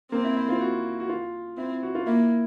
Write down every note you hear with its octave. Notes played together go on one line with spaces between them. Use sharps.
A#3 C4
E4
E4
F4
F#4
F#4
F4
C4 E4
F#4
F4
A#3 E4